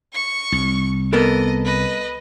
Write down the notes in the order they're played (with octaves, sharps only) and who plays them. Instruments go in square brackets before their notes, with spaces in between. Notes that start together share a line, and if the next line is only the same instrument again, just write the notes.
[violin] C#6 C#7
[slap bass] C2
[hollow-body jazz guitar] B3 A4 A#4 [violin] D#5
[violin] B4 D#5